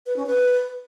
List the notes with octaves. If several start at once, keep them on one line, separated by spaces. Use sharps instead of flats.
B4
C#4
B4